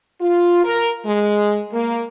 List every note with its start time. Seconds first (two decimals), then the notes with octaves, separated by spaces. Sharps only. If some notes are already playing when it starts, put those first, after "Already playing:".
0.21 F4
0.64 A#4
1.06 G#3
1.72 A#3